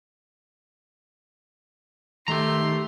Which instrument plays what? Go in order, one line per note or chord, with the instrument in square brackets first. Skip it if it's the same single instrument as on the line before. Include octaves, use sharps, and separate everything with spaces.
[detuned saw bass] D#3 [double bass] A3 [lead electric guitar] G4 A#5 [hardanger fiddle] C6